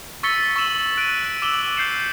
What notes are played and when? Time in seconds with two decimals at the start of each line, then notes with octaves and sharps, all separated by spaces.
0.23 C#6 E6 A6 B6 C#7 G7
0.56 C#6 E6 E7 F#7
0.97 F#6 D7 D#7
1.42 D6 E6 E7 F#7 G7
1.77 G6 C7 C#7 E7